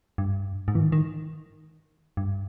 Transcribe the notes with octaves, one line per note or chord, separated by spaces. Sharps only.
G2
G#2
E3
D#3
D#3
G2